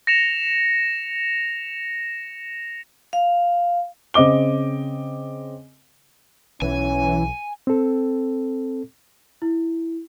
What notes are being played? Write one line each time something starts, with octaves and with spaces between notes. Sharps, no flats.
A#6 C#7 E7 F7
F5
C#3 C4 D#5 D6 G7
B1 E3 C#4 G#5
C4 A4
E4